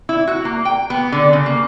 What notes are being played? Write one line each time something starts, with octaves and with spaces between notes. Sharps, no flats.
E4
F#4
A#3
G5
B3
D3
C#3
A#3